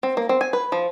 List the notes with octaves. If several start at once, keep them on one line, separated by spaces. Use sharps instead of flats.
C4
A#3
C4
G#5
B4
F3